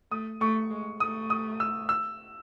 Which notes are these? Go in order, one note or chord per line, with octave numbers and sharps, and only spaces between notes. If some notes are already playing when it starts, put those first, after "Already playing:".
A3 D#6
A3 C#6
G#3
A3 D#6
D#6
E6
E6